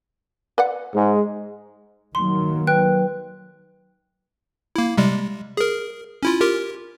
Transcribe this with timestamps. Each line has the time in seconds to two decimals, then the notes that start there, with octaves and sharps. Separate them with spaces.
0.58 B4 D5 F#5
0.95 G#2 G#3
2.15 D#3 F#3 A#3 C6
2.67 B4 G5 F#6
4.76 A#3 E4
4.98 C3 G3 G#3
5.57 G#4 A#4
6.23 C#4 E4 F4
6.40 F4 G4 A#4